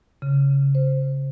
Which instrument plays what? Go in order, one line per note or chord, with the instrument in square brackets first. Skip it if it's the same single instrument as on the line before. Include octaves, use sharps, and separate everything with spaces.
[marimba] C#3
C5